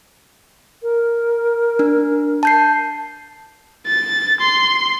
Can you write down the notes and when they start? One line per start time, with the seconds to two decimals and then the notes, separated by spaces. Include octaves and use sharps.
0.83 A#4
1.79 D4
2.43 A5 G6 C7
3.86 A6
4.41 C6